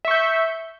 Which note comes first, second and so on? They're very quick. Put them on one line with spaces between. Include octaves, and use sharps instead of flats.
E5 C#6 G6